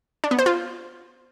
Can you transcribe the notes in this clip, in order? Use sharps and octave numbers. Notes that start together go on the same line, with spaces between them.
D4
B3
C5
F4